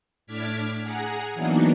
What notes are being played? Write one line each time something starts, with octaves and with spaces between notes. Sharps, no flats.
A2 D4 D6 F6 G#6 B6
G#4 F#5 G#5 A#5
E3 F#3 A#3 B3 D4 D#4